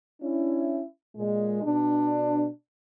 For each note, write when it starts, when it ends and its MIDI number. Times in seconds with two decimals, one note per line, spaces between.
0.21 0.81 61
0.21 0.81 62
0.21 0.81 64
1.16 1.62 46
1.16 1.62 56
1.63 2.48 47
1.63 2.48 62